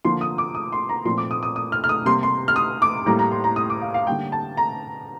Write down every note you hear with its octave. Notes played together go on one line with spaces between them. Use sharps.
D3 F3 A#3 C6
D#6
D6
D#6
C6
A#5
A#2 F3 A3 C4 C6
D6
D#6
D#6
D#6
F6
F6
D#6
C3 G3 A#3 C6
C6
F6
D#6
D6
A2 G3 A#3 A#5
A#5
C6
A#5
D#6
D6
F5
F5
D3 G3 A#3 G5
A5
A#5